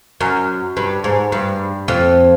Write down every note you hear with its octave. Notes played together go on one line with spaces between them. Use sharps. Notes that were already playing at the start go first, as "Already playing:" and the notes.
F#2
G2
G#2
G2
F2